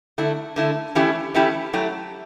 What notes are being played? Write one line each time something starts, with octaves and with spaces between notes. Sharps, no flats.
D3 A3 E4
D3 A3 E4
E3 A3 C#4 E4 G4
E3 A3 C#4 E4 G4
F#3 A3 E4 G4